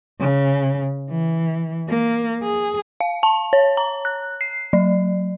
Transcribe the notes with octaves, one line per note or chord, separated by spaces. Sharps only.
C#3
E3
A#3
G#4
F5
A5
C#5
A#5
F#6
C7
F#3